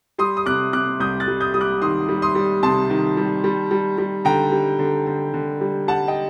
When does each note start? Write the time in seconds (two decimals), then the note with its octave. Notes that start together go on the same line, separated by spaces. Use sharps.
0.18 G3 C6 D#6
0.37 D#6
0.46 C3 D6 F#6
0.73 C3 D6 F#6
1.00 C2 D#6 G6
1.20 F#6 A6
1.27 G3
1.41 D#6 G6
1.54 G3 D#6
1.61 D6 F#6
1.82 D#3 C6 D#6
2.09 G3
2.22 C6 D#6
2.35 G3
2.63 C3 A5 C6
2.90 D#3
3.17 G3
3.44 G3
3.71 G3
3.98 G3
4.25 D3 G5 A#5
4.52 G3
4.79 D3
5.07 D3
5.34 D3
5.61 G3
5.87 G3 F#5 A5
6.08 D#5 G5